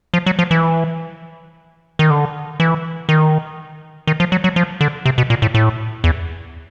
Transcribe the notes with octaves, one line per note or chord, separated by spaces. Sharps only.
F3
F#3
F3
E3
D#3
D3
E3
D#3
D#3
F3
F#3
F#3
F3
D3
C3
B2
A#2
A2
A2
E2